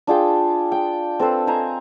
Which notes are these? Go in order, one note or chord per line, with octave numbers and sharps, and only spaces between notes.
D4 F4 G#4 G5
G5
C4 A4 B4 C5
C5 D#5 G#5 A#5